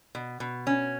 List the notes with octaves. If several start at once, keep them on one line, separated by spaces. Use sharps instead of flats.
B2
B2
C#4